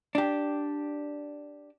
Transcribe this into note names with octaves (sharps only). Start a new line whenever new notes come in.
D4 G4